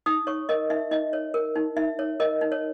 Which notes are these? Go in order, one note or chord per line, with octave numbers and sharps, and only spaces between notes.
D#4 D#6
C#5 C#6
A#4 D#5
D#4 E5
D#4 D#5
C#5
A#4
D#4
D#4 E5
C#5
A#4 D#5
D#4
C#5